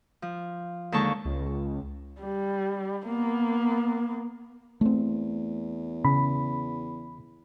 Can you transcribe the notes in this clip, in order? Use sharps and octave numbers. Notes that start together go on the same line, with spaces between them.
F3
D#2 D3 G#3 A4 A5 C#6
C#2
G3
A#3 B3
E2 A3 C4
C#3 B5